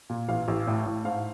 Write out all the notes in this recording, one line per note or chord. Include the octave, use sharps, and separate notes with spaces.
A#2
A1 F5
A1
A2
A2
G#2 F5